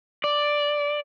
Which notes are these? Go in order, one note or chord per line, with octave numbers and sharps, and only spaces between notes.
D5